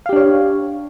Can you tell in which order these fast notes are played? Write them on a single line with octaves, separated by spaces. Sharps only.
F5 G4 D4 C#5